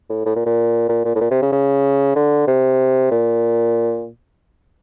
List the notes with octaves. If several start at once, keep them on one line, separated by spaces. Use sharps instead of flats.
A2
A2
A#2
A#2
A#2
A#2
A2
A#2
C3
C#3
C#3
D3
C3
A#2